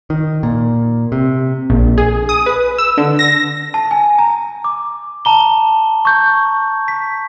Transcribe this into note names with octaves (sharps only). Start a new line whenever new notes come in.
D#3
A#2
C3
A#1
G#4
D#6
B4
E6
D3
A#6
A5
G#5
A#5
D6
A5 A#5 G7
C#6 G6
B6